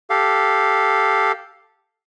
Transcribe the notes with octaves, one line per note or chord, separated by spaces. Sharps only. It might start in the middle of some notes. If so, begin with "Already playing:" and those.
G4 A4 F5